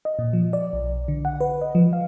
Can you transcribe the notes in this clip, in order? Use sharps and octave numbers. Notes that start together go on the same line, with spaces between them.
D#5
A#2
F3
D5
B1
D3
F#5
B4
D#5
F3
F5